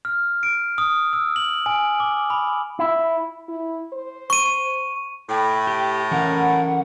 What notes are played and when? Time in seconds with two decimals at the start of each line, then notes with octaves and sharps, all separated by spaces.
0.05 F6
0.43 D7
0.78 D#6
1.13 E6
1.36 F#7
1.66 G#5
2.00 D6
2.30 B5
2.79 E4
3.48 E4
3.93 C5
4.30 C#6 D#7
5.29 A2 G5
5.67 G4
6.11 E3 C#4 A#4 F#5